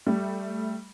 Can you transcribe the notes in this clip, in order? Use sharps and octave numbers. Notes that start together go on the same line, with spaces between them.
G3 A3